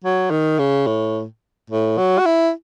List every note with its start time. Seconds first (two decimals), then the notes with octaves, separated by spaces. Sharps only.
0.04 F#3
0.31 D#3
0.59 C#3
0.87 A2
1.70 A2
1.98 F#3
2.19 F#4
2.26 E4